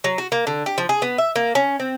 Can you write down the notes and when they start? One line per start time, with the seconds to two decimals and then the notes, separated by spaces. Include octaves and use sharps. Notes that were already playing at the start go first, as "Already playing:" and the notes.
0.04 F#3
0.18 F#4
0.32 A#3
0.47 D3
0.66 G4
0.78 F3
0.89 G#4
1.02 B3
1.18 E5
1.36 A#3
1.55 C#4
1.80 C4